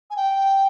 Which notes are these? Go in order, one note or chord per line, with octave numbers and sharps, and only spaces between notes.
G#5
G5